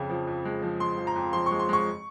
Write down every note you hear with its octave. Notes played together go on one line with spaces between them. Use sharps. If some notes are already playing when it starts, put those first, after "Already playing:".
Already playing: F2 C#3
F3
F2
G#3
F3
G#3 C6
F3
A#5
F2
F3 C6
G#3 C#6
C6
G#3 C#6